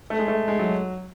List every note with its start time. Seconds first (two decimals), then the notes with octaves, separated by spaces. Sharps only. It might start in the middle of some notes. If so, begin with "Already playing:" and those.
0.10 A3
0.19 G#3
0.28 A3
0.48 G#3
0.59 F#3